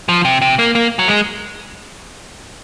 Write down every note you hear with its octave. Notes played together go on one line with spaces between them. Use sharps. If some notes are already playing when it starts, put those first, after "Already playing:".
F3
C3
C3
A#3
A#3
F#3
G#3